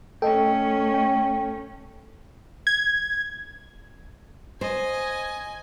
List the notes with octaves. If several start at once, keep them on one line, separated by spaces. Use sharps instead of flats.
A3 C#4 A4 D#5 G5
G5
G#6
C5 D#5 G#5